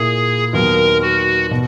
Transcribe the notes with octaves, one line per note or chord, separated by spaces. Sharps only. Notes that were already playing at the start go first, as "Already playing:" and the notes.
Already playing: A#2 A#3 E4 G#4
D#2 D#3 F#3 B3 A#4
F#4
B2